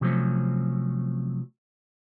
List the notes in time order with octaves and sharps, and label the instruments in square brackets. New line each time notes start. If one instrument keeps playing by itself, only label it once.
[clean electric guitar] C3 F3 F#3 A3 C4 C#4